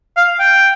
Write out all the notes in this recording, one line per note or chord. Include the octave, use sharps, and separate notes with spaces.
F5
G5